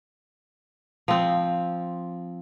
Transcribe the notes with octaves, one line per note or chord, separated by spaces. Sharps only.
F3 C4